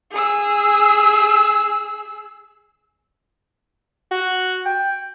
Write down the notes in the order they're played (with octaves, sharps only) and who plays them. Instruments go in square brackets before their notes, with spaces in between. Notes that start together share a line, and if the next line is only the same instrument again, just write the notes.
[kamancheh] G#4 E6
[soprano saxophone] F#4
G5